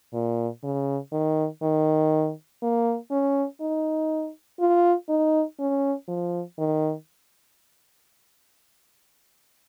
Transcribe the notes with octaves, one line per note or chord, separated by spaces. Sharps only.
A#2
C#3
D#3
D#3
A#3
C#4
D#4
F4
D#4
C#4
F3
D#3